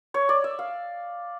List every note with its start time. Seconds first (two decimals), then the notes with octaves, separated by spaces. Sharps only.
0.14 C#5
0.29 D5
0.44 E5
0.59 F5